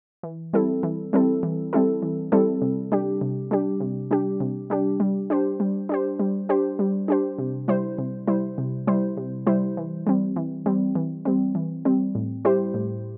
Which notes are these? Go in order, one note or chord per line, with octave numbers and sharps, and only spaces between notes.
E3
G3 C4 E4 A4
E3
G3 C4 E4 A4
E3
G3 C4 E4 A4
E3
G3 C4 E4 A4
C3
G3 D4 G4
C3
G3 D4 G4
C3
G3 D4 G4
C3
G3 D4 G4
G3
D4 G4 C5
G3
D4 G4 C5
G3
D4 G4 C5
G3
D4 G4 C5
C3
G3 E4 C5
C3
G3 E4 C5
C3
G3 E4 C5
C3
G3 E4 C5
E3
G3 C4
E3
G3 C4
E3
G3 C4
E3
G3 C4
A2
G3 E4 G4 C5
A2